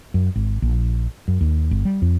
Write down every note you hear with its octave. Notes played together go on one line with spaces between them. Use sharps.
F#2
G#1
A#1
F#2
D#2
G1
G3
F2